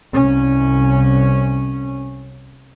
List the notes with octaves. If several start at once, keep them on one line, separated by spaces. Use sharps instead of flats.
C2 C#4